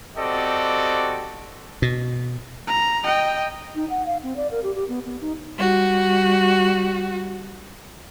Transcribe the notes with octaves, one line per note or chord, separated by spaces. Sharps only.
C4 F#4 G4 A4 D5 D#5
B2
A#5
D#5 G5
D#4
F#5
F5
C4
D5
A#4
G4
G4
B3
B3
D#4
G3 F#4